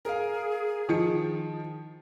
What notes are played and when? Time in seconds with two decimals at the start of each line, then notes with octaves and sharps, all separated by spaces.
0.05 G#4 A#4 F5
0.89 D#3 F3 C#7